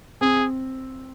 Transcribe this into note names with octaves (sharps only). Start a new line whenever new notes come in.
C4 G#4